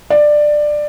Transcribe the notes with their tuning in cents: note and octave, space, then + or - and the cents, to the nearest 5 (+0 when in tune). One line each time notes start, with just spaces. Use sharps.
D5 +15